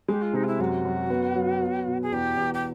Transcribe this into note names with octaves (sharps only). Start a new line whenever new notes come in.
G#3 G4
F4
C3 D#4
F4
E4
F#2 F#4
F#2
B3
F#3
B3
B2
G#4
E2 G4
E2
G4